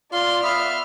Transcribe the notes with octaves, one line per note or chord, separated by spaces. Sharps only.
F4 D5 C6
B3 E5 F5 F6